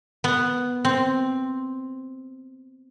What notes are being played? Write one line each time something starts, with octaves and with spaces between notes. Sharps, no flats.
B3
C4